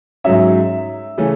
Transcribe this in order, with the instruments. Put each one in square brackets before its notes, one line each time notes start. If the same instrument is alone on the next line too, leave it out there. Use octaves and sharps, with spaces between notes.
[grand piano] G#2 F#3 C#4 E5
C#3 E3 A3 C#4